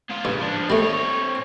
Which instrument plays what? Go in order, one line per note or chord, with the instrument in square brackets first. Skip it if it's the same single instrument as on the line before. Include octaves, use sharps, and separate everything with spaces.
[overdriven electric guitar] G#2 F4
[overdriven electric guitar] C#2 C#3 [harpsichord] G2
[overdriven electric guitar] F3 D4
[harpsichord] G3 A3 [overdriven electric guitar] C4 C#5